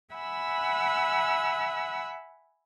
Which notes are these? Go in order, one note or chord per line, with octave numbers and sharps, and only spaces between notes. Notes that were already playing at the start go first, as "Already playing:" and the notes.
E5 F#5 G#5 B5 E6